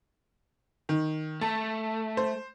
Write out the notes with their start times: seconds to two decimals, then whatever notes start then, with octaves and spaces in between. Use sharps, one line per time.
0.89 D#3
1.41 A3 A5
2.17 C5